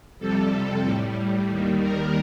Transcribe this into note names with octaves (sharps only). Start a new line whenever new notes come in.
F2 C3 G3 A4
A2 G3
D#2 D#3 G3
A#4